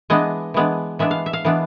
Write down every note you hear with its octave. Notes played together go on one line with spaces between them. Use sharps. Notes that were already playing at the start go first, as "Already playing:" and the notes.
E3 G#3 B3 D4 D#5
E3 G#3 B3 D4
E3 G#3 B3 D4 E5
F5
E5
F5
E3 G#3 B3 D4